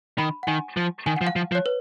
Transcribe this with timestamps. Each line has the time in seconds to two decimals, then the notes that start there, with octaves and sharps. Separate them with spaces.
0.18 D#3 B5
0.43 F#5
0.47 D#3 G#5
0.77 F3
1.06 D#3 G#5
1.16 F#5
1.21 F3
1.27 F5
1.36 F3
1.52 F3
1.55 C#5
1.66 B4